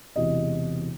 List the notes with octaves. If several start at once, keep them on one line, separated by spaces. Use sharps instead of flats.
E1 E2 C3 D#5